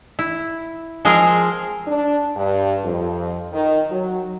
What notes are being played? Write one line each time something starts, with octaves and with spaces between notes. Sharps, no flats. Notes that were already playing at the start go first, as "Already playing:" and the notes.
E4
F3 G#3 C4 G#4 A#4
D4
G2
F2
D#3
F#3